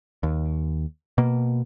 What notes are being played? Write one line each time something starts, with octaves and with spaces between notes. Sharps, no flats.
D#2
B2 A#3